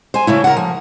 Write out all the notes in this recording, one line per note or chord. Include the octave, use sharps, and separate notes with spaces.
C5 G#5
C#3 A3 E4
A#4 F#5
F3